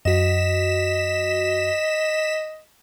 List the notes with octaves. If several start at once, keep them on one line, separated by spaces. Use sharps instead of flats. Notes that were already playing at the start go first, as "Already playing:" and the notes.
F#2 F#4 D#5 B6 E7